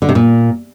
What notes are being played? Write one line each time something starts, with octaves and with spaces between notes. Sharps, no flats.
D3
C3
A#2